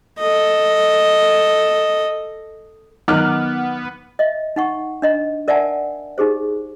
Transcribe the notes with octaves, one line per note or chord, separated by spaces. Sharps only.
A4 D#5
D#3 F#3 B3 D#4 D6 F6 F#6
D#5 E5
D#4 F#5 C#6
D4 D#5 A#5
A#4 D5 E5 F#5 G#5 A5
D#4 G4 G#4 C5